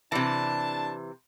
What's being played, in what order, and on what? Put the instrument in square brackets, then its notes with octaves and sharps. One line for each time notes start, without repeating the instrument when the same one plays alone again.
[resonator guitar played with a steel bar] C3 E3 [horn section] D4 A5